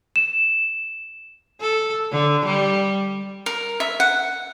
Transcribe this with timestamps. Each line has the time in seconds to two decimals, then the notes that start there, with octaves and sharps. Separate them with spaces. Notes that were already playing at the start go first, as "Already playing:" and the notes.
0.16 E7
1.61 A4
2.12 D3
2.45 G3
3.46 A#4
3.80 E5
4.00 F#5